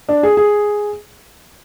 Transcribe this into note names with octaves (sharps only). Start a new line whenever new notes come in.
D4
G#4
G#4